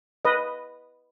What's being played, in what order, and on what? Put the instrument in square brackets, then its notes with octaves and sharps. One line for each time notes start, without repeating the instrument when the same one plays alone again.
[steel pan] B4 D#5